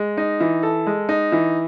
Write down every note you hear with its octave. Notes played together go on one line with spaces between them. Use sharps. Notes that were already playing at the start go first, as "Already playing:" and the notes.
Already playing: G#3
D#4
E3
A4
G#3
D#4
E3